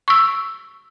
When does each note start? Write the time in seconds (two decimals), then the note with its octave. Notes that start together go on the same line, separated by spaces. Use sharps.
0.08 C#6 E6